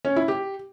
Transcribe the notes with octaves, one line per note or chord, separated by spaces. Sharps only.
C#4
E4
G4